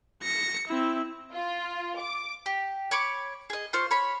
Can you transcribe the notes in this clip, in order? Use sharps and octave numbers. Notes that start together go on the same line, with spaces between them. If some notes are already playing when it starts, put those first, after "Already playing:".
A#6 C#7
C4 E4
F4
D6
G4
C#5 B5 C#6 D6
G#4 D#5
F4 C5 C#6
C#5 B5